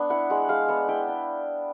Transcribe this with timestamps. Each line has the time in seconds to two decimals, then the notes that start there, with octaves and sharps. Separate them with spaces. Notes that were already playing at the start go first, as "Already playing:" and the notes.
Already playing: B3 D4
0.10 E4 F#5
0.30 G#3 F#5
0.49 G#3 F5
0.68 B3 F#5
0.88 E4 G5
1.08 D4